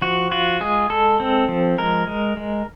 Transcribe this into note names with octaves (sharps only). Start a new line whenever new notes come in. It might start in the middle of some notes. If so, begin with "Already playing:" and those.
F3 F#4
F4 F#4
G#3 G#4
G#3 A4
C4
F3
G#3 A#4
G#3
G#3